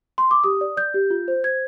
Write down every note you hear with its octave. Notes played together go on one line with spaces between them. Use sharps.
C6
D6
G4 D#6
D5
D5 G6
G4
F4
C5
C5 G#6